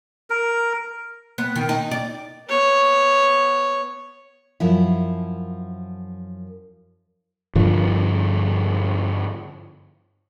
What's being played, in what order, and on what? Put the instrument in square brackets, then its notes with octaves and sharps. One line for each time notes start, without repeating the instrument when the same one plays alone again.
[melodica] A#4
[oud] B3
D#3
D#4
D5
[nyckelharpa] B3 C#5
[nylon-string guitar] F#2 F3 E4
[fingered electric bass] G2 D3 F3